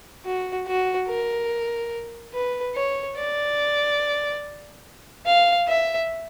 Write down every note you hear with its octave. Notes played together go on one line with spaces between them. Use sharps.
F#4
F#4
A#4
B4
C#5
D5
F5
E5